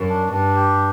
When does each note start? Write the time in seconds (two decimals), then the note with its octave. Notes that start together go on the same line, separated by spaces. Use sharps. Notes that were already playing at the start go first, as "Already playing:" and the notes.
Already playing: F#2
0.09 D4
0.32 G2 D4
0.56 G4